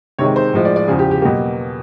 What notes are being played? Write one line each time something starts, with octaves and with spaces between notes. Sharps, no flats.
C3 D#3 G#3 C#5
C5
A2 F3 G#3
D5
D5
E2 C#3 F3 G#4
G4
G4
B2 F#3 A#3 G4